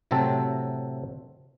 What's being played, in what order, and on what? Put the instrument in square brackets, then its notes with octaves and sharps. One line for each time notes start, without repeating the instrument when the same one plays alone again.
[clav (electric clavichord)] A2 C3 F#3 C4 A4